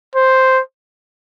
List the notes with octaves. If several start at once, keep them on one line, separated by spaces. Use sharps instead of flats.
C5